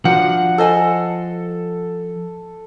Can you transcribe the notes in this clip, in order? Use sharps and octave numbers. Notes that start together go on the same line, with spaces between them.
F3 D4 F#4 A#4 F#5
A4 C5 D#5 G#5